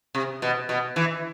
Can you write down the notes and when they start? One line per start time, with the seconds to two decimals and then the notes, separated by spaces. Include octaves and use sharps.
0.15 C3
0.42 B2
0.69 B2
0.96 E3